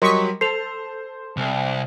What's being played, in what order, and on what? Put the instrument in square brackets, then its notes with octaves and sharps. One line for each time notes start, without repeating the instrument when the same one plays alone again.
[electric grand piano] F#3 G3 [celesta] A#4 C6 [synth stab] D#5 C#6 B6
[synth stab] A4 [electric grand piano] C5 [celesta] C7 F7
[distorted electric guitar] C2